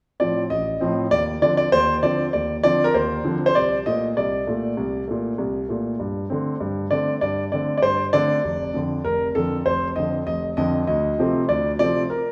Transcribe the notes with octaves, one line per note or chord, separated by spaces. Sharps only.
A2 F3 C4 D5
A1 D#5
A2 F3 C4
D#2 D5
D3 F3 C4 D5
D5
D#2 C5
D3 F3 C4 D5
D#2 D5
D3 F3 C4 D5
A#4
D#2 C5
D3 F3 C4
C5
C2 D5
A#2 A3 D#5
C2 D5
A#2 A3
C2
A#2 A3
C2
A#2 A3
G2
D3 A3 C4
G2
D3 A3 C4 D5
G2 D5
D3 A3 C4 D5
D5
G2 C5
D3 A3 C4 D5
F1
F2 D3
F1 A#4
F2 D3 A4
F1 C5
F2 D3 D#5
F1 D#5
F2 D3 D#5
D2 D#5
C3 F3 A3 C4
D2 D5
C3 F3 A3 C4 D5
A#4